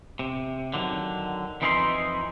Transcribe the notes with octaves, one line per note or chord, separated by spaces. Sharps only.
C3
D3 D#3 F#3
F2 E3 D#4 E4 A#4 C6